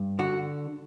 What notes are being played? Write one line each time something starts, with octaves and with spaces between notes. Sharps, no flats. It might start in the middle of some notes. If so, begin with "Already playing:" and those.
Already playing: G2
D3 F#4